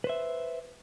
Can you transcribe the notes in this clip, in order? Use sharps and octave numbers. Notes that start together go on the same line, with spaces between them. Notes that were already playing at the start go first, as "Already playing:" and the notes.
B4 C5 E5